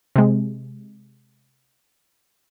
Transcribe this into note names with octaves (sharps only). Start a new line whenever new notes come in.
C3 G#3